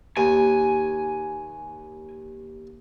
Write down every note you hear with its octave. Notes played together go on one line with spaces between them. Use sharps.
D#2 G#5